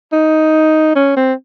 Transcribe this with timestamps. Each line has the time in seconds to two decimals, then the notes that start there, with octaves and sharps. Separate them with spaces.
0.13 D#4
0.96 C#4
1.17 C4